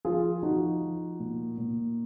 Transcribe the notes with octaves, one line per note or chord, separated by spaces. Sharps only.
F3 F4 G#4
F3 D#4 F#4
F3
A#2
A#2